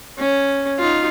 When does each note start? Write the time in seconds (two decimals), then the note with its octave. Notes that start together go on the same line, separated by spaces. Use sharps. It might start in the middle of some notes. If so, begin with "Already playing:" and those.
0.18 C#4
0.79 D#4 F4